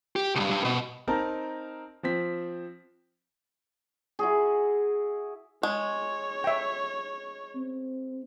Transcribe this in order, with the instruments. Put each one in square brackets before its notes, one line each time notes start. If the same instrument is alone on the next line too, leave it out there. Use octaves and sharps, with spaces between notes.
[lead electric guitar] G4
C2 G2
G2
B2
[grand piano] C4 D#4 A#4 A5
F3 C4 B6
[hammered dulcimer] E4 F#4 G#4
[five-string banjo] G#3 [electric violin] C#5
[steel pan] E5 G5
[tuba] C4